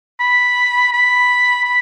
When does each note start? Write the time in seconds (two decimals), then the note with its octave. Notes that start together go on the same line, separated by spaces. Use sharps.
0.20 B5
0.93 B5
1.64 B5